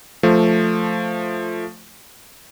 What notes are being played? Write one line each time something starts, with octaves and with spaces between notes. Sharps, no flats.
F3 A3